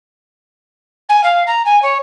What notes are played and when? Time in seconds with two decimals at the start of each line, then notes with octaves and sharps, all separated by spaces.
1.09 G#5
1.23 F5
1.46 A#5
1.65 G#5
1.82 C#5